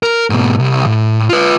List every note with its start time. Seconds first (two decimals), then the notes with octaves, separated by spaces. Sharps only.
0.03 A#4
0.30 G#2 B2
0.60 C2
0.86 A2
1.29 F4 B4